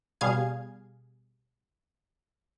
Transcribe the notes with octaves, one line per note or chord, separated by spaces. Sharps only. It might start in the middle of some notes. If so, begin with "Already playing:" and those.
B2 G3 G#4 F5 G#6